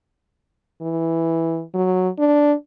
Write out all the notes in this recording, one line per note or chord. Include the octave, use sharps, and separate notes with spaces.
E3
F#3
D4